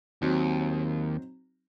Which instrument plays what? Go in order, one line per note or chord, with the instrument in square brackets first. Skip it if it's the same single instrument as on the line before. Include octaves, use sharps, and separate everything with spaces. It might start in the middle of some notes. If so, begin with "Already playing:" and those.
[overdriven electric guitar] D#2 [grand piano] F#3 C4 D#4